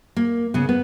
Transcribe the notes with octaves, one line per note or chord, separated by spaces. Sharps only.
A#3
C#3 B3
B3